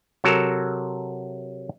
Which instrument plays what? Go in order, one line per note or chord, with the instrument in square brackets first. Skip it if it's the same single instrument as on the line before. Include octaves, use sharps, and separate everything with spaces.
[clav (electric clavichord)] C3 F#3 F#4 A4 A#4